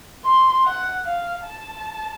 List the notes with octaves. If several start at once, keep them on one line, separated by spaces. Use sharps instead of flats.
C6
F#5
F5
A5